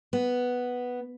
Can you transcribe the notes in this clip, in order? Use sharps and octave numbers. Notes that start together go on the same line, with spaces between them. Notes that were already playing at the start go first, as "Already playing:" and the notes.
B3